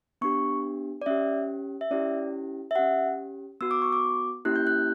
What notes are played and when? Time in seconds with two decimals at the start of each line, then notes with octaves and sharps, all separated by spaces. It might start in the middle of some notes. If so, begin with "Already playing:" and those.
0.21 B3 D4 G4 C#6
1.02 D5
1.06 C#4 G4 E5
1.81 E5
1.91 C#4 E4 G4 D5
2.71 E5
2.75 C#4 G4 F#5
3.61 B3 F#4 E6
3.71 D6
3.82 C#6
3.92 D6
4.45 A#3 C#4 E4 G4 F#6
4.56 G6
4.67 F#6